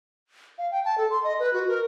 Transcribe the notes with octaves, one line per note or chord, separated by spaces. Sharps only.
F5
G5
A5
A4
C6
D#5
B4
F#4
A#4